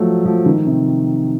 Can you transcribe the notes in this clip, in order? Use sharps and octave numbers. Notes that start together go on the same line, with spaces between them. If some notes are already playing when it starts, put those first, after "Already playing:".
Already playing: F3 F#3 A3
F3
D#3
C3